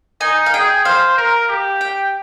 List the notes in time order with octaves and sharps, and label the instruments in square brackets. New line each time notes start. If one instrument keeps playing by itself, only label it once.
[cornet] D#4 [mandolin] G#5
[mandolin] F5
[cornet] G#4 [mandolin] G5
[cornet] C5 [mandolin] F5
[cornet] A#4
G4
[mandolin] G5